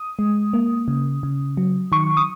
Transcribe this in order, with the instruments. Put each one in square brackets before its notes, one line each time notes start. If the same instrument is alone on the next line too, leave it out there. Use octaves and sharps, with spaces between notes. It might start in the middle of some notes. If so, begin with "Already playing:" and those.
Already playing: [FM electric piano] D#6
G#3
A#3
C#3
C#3
F#3
D#3 C#6
D#6